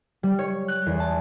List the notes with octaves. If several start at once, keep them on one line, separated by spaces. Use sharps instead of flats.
G3
C#5
F#6
E2
A5